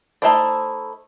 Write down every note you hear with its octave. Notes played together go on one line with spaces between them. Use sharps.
A3 D#4 E4 C5 D5